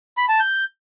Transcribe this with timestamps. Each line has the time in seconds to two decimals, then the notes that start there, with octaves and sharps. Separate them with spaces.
0.17 B5
0.29 A5
0.40 G6